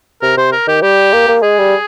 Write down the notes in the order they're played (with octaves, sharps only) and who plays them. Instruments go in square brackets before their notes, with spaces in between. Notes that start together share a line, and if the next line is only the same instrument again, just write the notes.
[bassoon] C3 [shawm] A#4
[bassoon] C3 [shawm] C5
[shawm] A#4
[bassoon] D#3 [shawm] G4
[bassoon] G3 [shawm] G4
[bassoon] A#3
A#3
[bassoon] G#3 [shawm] G#4
[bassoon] G3